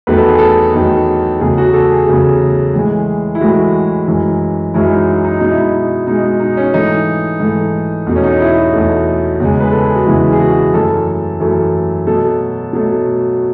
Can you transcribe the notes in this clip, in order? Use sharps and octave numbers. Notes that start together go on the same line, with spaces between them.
E2 D#3 F#3 A3 B4
A4
G#4
A4
E2 D#3 F#3 A3
E2 C#3 F#3 A3 G#4
F#4
A4
G#4
E2 C#3 F#3 A3
A2 E3 G#3
E4
A2 E3 G#3 F#4
F#2 E3 G#3
F#2 E3 G#3 E4
D#4
D#4
B2 G#3 D#4
E4
D#4
B2 G#3 D#4
D#4
D#4
C#4
G#2 E3 A3 D#4
G#2 E3 A3
E2 B2 A3
C#4
D#4
E4
E4
F#4
E2 B2 A3
E2 C#3 E3 G#3
B4
A4
G#4
F#4
E2 C#3 E3 G#3 E4
G#4
F#4
F#2 E3 A3 A4
F#2 E3 A3
B2 F#3 A3 A4
B2 F#3 A3